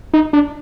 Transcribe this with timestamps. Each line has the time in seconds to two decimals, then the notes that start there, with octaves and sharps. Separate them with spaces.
0.14 D#4
0.33 D4